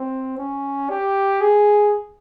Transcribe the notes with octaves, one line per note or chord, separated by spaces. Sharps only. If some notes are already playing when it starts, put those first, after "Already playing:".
Already playing: C4
C#4
G4
G#4